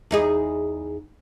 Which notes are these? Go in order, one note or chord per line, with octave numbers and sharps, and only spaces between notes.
E2 D#4 G#4